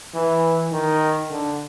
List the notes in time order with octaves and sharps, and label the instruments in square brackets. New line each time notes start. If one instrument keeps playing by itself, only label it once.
[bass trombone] E3
D#3
D3